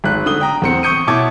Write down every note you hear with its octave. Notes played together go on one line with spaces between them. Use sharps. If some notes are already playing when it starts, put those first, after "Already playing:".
G#1 F#6
D3 D#6 G7
G5 A#5 D#6
E2 C4 C#7
C#6 D#6 G6 C#7 D#7
B2 E4 C#5 A5 D6 G#6